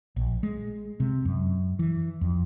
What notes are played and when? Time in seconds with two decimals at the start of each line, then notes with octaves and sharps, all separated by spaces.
0.16 A#1
0.43 G#3
1.00 C3
1.25 F#2
1.79 E3
2.21 F2